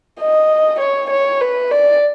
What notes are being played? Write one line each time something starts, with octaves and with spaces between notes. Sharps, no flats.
D#5
C#5
C#5
B4
D5